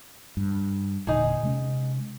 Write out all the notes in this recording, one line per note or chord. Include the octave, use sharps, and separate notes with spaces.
G2
E1 A#2 D3 D#4 G#4
C3 G#3 C#4